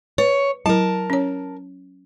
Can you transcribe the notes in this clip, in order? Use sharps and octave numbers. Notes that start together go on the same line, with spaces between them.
B4 C#5
F#3 E4 A#4 A5
C#4 C#5